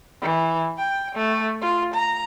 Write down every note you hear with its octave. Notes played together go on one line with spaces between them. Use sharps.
E3
G5
A3
F4
A#5